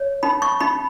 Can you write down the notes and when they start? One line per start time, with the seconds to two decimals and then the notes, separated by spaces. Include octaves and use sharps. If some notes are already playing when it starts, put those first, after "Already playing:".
Already playing: C#5
0.23 D#4 B5
0.42 C#6
0.60 D#4 B5